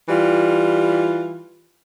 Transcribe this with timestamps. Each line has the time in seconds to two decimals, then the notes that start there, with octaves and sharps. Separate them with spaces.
0.08 E3 G3 F4